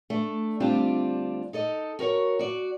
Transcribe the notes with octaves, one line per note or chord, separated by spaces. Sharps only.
A3 D4
D2 G3 C4 D4 F4
D#4 A4 D#5
F#4 A#4 C5 C#5
F#4 D5